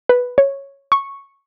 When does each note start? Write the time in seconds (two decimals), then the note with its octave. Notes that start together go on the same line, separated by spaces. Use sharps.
0.09 B4
0.38 C#5
0.92 C#6